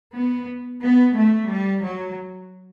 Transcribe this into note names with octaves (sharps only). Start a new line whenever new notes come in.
B3
B3
A3
G3
F#3